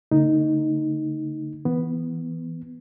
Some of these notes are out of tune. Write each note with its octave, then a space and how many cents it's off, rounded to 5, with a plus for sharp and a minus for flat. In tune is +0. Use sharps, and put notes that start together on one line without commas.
D3 -40 A3 +40 D#4 +0
E3 +0 B3 +0